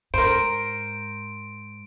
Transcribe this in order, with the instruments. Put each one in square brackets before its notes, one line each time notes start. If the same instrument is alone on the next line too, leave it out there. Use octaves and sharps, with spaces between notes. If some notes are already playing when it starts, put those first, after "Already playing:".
[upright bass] G#2 [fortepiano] A#4 C5 [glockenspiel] D7